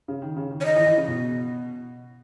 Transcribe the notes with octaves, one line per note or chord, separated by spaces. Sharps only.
C#3
D#3
C#3
D#3
C#5
D#3 D#5
E3
E3
C#3
B2